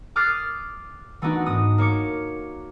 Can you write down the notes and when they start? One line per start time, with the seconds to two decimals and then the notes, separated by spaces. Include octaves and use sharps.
0.16 D6 D#6 F6 F#6 A6 C7
1.22 E3 A3 B3 D4 D#4 F#4
1.46 G#2 D#6
1.78 A#3 C#5 D6 C#7